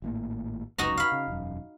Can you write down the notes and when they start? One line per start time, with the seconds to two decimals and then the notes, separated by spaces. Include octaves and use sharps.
0.02 G#1 A2 A#3
0.78 F1 C#2 F#2 D#4 F#4 A#5
0.97 F5 B5
1.12 C#3
1.28 E1 F#2